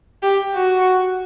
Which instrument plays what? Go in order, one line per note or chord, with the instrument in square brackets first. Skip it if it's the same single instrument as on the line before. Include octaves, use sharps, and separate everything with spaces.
[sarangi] G4
F#4